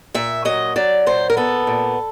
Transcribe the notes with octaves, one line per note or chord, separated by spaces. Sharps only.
A#2 E5
F#3 D#5
F#3 D5
A#2 C5
A#4
B3 A4
A#2